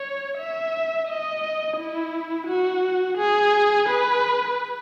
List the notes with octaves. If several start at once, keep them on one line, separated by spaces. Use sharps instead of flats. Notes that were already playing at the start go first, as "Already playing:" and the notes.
Already playing: C#5
E5
D#5
E4
F#4
G#4
B4